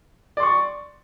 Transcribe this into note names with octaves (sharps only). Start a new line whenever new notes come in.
D5 C6 C#6